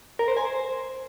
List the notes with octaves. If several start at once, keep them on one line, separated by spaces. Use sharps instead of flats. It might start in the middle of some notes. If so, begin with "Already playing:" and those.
A#4
C5
G#5
C5